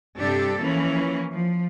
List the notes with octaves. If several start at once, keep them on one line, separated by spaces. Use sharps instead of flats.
G2 C3 D4 G4 A4
E3 F3 A#3 C#4
F3